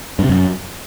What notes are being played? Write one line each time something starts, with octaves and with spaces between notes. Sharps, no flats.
G2
C3
F#2